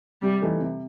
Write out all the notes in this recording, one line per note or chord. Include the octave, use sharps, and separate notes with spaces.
C3 G3
E3 A3 D#4 G4
C3